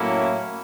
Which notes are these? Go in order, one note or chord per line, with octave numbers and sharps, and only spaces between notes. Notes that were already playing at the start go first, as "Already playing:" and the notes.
Already playing: A2 F#3 A#3 C#4 E4